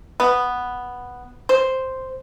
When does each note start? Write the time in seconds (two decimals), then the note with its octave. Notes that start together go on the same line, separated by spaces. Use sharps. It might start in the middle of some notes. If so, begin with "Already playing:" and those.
0.20 B3
1.49 C5